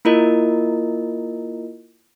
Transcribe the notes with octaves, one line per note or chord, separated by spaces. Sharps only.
A#3 E4 F4 A#4 D#5